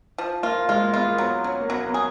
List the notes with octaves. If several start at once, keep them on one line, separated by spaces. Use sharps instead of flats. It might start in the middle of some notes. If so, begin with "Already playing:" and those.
F3
A#3 F4
G#3 F4
A#3
B3 F4
A#3
F#3 B3
F#3 C#4
A#3
F#3 B3
B3
G#4